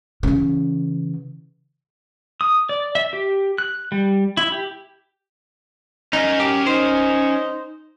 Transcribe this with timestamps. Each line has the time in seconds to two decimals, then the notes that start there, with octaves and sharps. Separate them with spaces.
0.23 C#3 E3
2.41 D#6
2.69 D5
2.95 E5
3.13 G4
3.58 F#6
3.92 G3
4.37 E4
4.52 G4
6.13 C#4 D#4 A#4
6.40 G4
6.67 D#4 C5